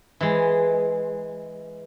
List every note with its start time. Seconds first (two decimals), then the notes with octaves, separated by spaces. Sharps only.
0.20 E3 G#3